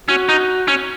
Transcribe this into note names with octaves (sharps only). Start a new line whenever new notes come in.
C#4 F#4
D#4
C#4